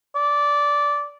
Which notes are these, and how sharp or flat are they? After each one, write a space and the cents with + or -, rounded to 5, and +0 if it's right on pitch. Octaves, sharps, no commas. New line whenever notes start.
D5 -15